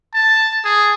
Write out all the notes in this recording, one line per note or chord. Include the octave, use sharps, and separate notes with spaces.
A5
G#4